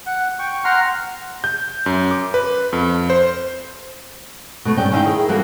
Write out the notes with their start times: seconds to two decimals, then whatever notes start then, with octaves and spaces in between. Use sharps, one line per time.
0.06 F#5
0.39 G5 C#6
0.65 F#5 A#5 C6 F6
1.44 G6
1.86 F#2
2.11 D6
2.34 B4
2.73 F2
3.10 C5
4.65 B2 A3
4.77 G2 G3 C#4 G5
4.91 D#3 C#4 E4 D#5 F5 G5
5.04 E4 G#4 A#4
5.28 E3 G3 A#3 C4 F#4 A4